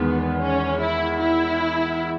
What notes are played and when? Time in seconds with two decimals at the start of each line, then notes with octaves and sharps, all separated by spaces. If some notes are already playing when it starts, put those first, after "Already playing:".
Already playing: E2 D#3 G#3 B3
0.42 C#4
0.82 E4
1.22 E4